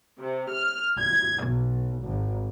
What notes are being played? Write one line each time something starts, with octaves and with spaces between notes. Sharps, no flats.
C3
F6
G#6
B1
G#1